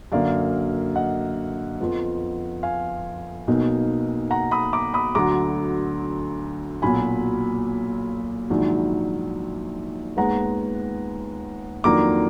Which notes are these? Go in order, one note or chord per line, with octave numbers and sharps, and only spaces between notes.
F#2 D3 F#3 A#3 D5 F5
D#5 F#5
F2 F3 B3
F5 G#5
B1 B2 A#3 D#4
F#5 A#5
B5 D#6
A#5 D6
B5 D#6
D2 D3 F#3 A#5 D6
B1 A#2 F#3 G#5 B5
A#1 G#2 D#3 F#3 D4
D#2 D#3 G#3 B3 F#5 A#5
F2 D#3 F#3 A#3 D4 A#5 D6